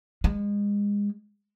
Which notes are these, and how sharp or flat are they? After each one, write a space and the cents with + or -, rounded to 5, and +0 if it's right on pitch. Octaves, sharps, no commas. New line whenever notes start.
G#3 -30